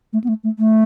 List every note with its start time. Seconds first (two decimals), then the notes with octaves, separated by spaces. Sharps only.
0.13 A3
0.24 B3
0.28 A3
0.44 A3
0.59 A3